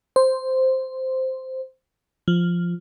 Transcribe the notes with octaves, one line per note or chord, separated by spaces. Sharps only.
C5
F3